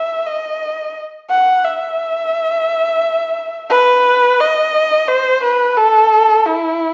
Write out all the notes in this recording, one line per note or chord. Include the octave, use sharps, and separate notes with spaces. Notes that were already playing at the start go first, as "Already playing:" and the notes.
Already playing: E5
D#5
F#5
E5
B4
D#5
C5
B4
A4
E4